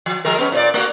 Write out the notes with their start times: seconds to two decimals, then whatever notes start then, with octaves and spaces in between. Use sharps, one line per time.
0.06 F3
0.25 F3 G#3 A#4
0.38 B3 C#4
0.52 A#2 C#5 D5
0.74 A3 A#3 F#4